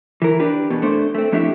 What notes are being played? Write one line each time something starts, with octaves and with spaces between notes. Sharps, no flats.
E3 A#4
D4 G4 B4
E2 B2
A3 D4 C5
A3 C4
F2 A3 D4 E4 G4 E5